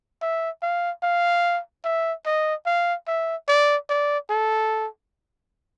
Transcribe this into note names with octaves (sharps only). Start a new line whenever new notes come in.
E5
F5
F5
E5
D#5
F5
E5
D5
D5
A4